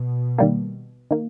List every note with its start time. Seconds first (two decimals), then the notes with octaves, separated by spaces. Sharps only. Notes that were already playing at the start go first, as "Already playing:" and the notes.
Already playing: B2
0.38 D#3 G3 A#3
1.11 D#3 A#3